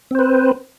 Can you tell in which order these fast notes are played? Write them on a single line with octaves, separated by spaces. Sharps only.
C4 C5 B4